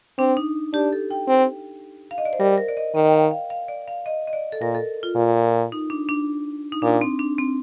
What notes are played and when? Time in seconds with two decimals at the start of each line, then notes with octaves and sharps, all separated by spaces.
0.18 C4 D4
0.37 D#4
0.73 D4 G4
0.92 A4
1.10 G5
1.28 C4
2.11 F5
2.18 D#5
2.25 D5
2.33 C5
2.40 G3 A#4
2.58 A#4
2.68 D5
2.77 D#5
2.95 D#3 D#5
3.06 G5
3.14 F5
3.31 F5
3.50 F5
3.68 D5
3.88 F5
4.06 D#5
4.28 D#5
4.33 D5
4.52 A4
4.61 A#2 A#4
4.75 A4
5.03 F4
5.16 A#2
5.72 D#4
5.90 D4
6.09 D4
6.72 D#4
6.82 A#2 D4
7.01 C4
7.19 D4
7.38 C4